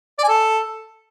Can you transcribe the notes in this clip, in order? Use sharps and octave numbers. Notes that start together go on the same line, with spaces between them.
D5
G#5
A4